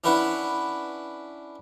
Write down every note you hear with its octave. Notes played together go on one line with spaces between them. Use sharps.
C#4 D4 E4 B4 F#5 B5